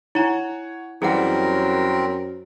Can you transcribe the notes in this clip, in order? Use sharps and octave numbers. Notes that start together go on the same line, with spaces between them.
E4 C#5 F#5 G#5 A#5
F#2 E3 G3 C4 G#4 A#4 F#5